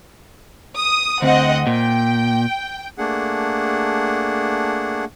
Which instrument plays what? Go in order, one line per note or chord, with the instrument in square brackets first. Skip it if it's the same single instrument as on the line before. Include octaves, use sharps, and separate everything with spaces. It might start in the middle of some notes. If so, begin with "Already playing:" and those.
[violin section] D#6
[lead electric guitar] D2 [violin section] C4 D#5 F#5
[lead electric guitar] A#2 [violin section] G5
[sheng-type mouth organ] A3 A#3 D4 G#4 F#5